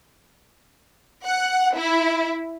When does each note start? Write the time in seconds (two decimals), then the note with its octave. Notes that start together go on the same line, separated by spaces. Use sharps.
1.25 F#5
1.75 E4